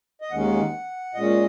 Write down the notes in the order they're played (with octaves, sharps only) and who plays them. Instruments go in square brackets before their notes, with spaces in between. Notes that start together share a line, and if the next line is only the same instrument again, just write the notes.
[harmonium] D#5
D#2 D#3 G#3 C#4 F#5
A#2 G#3 C#4 D#5